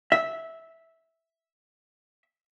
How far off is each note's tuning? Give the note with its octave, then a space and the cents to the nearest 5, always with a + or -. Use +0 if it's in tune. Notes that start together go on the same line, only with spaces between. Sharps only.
E5 -10